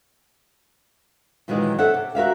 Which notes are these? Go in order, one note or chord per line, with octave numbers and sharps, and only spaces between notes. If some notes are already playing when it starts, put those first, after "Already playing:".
A#2 D#3 E3 F#3 G#3 G#4
A4 C#5 E5 F#5
C3
F#4 A#4 E5 F5